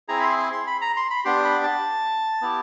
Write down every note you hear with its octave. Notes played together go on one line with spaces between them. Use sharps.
C4 E4 G#4 A#5
B5
C6
C6
C6
B5
A#5
C6
B5
B3 D4 G4 C6
B5
A5
B3 E4 G4